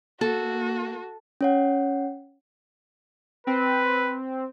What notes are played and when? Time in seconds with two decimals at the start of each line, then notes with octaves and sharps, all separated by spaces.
0.21 A#3 F#4 A4 A5
1.41 C#4 C#5 F#5
3.47 C4 B4